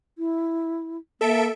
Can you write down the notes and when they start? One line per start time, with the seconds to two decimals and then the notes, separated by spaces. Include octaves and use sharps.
0.18 E4
1.21 A#3 A4 E5 D7